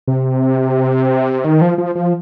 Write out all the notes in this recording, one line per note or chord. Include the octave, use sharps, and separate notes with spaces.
C3
D#3
F3
F3
F3